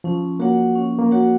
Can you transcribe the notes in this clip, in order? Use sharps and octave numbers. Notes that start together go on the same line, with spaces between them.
F3 C#4
A#3 F#4 C#5 F#5
C#4
A#3
F#4 C#5 F#5